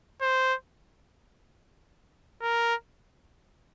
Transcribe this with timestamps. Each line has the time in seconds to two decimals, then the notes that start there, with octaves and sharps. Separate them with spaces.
0.21 C5
2.42 A#4